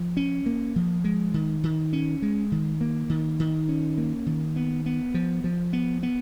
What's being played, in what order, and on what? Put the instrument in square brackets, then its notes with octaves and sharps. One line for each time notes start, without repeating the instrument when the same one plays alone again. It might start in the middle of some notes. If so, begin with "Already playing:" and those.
Already playing: [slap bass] F3
C#4
A#3
F3
G#3
D#3
D#3
C#4
G#3
D#3
A#3
D#3
D#3
C#4
A#3
D#3
B3
B3
F3
F3
B3
B3